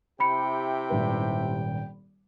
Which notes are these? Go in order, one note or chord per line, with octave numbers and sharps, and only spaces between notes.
C3 E4 G4 G5 B5 C#7
D#1 G#1 B4